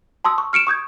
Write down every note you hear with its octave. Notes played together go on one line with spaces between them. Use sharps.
A5 C6 D#6 E6
C#6
F6 C#7 D7 E7
C#6 D#6 G6 G#6